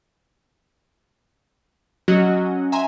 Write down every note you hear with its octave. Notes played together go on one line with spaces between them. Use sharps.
F#3 C#4 F#4 D#5
E5 G#5 A#5 C6